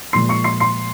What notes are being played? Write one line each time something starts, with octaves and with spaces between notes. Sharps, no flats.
A#2 F3 G#3 C6 C7
C#6 C#7
C6 C7
C6 C7